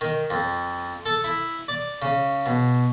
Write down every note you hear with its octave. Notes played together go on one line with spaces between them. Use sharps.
D#3
F2
A4
E4
D5
C#3
B2